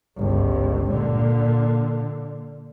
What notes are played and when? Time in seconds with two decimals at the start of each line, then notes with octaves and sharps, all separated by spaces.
0.18 G1 C#2
0.90 A#2 D3